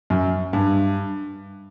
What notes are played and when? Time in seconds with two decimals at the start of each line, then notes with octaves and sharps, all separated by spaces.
0.10 F#2
0.53 G2